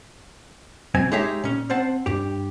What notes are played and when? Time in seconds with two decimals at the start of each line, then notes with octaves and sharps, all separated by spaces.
0.94 B1 F#2 C4 G#5
1.12 G#3 D#4 G4 G#4 C#5 E5
1.44 A#2 C#4
1.70 C4 C5 F#5 A5
2.06 G2 G4